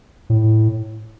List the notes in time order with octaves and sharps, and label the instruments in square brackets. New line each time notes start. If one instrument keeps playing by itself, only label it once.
[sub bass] A2